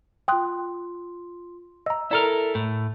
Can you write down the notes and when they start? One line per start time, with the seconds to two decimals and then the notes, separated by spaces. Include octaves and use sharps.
0.28 F4 G5 C6 D#6 F#6
1.86 D#5 A#5 E6
2.11 E4 A4 A#4 D5 A#5 F6
2.55 A2